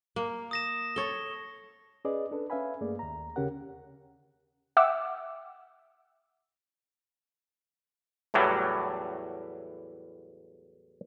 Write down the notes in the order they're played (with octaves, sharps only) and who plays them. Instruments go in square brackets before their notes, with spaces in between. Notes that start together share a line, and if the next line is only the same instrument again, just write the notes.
[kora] A#3
[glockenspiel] D#6 A#6 E7
[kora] A4 C#5 [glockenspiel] G7
[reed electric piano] C#4 G#4 B4 D5 D#5
D4 A4 B4
C#4 B4 E5 F5 G#5 B5
G2 A3 A#3 G#4 D5
D#2 A#5
D#2 C#3 C#4 G4 A#4 F#5
[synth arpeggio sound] E5 F#5 G5 D6 E6
[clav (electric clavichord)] E2 A2 E3 F#3 G3